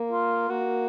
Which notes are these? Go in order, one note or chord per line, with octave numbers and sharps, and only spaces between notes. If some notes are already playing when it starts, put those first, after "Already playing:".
Already playing: A#3
F4
A#3 F#4